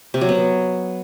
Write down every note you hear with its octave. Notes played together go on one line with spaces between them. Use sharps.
C3
F#3
B3